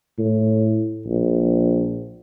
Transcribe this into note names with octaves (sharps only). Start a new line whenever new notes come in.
A2
A#1